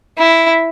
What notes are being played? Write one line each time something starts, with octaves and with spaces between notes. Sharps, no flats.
E4